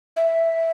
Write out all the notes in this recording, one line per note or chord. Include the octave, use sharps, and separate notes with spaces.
E5